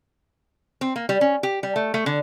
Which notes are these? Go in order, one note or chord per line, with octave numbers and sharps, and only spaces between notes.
C4
A#3
G3
C#4
G4
G3
A3
A3
D3